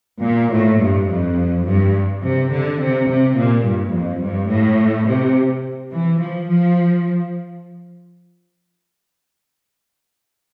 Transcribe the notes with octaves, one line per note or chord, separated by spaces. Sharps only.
A#2
A2
G2
F2
G2
C3
D3
C3
C3
A#2
G2
F2
G2
A2
C3
E3
F3
F3